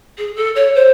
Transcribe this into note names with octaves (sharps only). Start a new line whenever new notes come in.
G#4
A4
C#5
C5